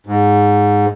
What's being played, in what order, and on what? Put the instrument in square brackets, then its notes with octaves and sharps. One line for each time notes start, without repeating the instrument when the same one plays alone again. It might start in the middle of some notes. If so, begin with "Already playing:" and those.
[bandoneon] G#2